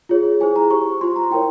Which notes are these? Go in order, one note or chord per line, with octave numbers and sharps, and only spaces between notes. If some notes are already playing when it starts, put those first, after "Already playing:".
F4 G#4 C#5
E4 G#4 C5 G#5
A#5
G4 C5 C#6
F4 C5 C6
A#5
E4 A#4 C#5 G5